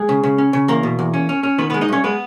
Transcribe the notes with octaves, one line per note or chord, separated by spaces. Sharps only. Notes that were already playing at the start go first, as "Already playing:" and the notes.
Already playing: G#3 G#4
C#3
C#3
C#4
C#3
E2 A#3 A#4
B2
E2
C#4
C#4
C#4
D#3 B3 B4
B3 B4
G#3
D#4 D#5
G2 C#4 C#5
G#3 B3 B4